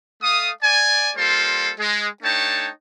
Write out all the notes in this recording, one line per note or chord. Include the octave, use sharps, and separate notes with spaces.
A3 F5 D#6
D5 G#5
G3 A#3 F4 A4 C5 C6
G#3
A3 D4 D#4 C#5 G5 A5